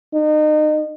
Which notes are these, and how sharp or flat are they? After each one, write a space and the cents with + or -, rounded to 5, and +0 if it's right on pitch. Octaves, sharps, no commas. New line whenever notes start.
D#4 -30